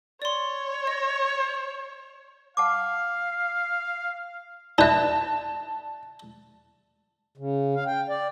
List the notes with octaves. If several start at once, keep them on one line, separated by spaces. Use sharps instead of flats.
C#5 D5 C6
D#5
F5 F#5 A5 D6
D#4 B4 D5 E5 A5
C#3
F5
G5
D5